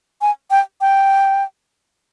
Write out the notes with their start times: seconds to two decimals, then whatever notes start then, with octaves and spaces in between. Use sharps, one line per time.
0.21 G#5
0.51 G5
0.81 G5